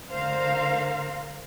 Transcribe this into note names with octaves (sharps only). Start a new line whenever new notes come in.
D3 A#4 C5 F5